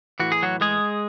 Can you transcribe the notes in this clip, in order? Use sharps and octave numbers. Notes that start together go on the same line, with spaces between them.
A2 E3 F#4
G#4
F#3 F#4
G#3 G#4